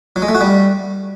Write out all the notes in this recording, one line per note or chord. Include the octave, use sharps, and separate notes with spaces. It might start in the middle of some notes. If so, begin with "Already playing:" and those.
F#3
G#3
A3
F#4
G3